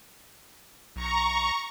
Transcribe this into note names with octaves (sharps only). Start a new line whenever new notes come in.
B1 A#5 C#6